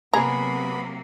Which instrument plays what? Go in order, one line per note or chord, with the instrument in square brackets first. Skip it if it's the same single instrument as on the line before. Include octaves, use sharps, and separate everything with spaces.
[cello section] C3 F#3 A#3 [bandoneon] B3 B5 [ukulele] G#4 [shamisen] A#5